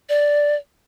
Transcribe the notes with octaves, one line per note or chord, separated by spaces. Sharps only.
D5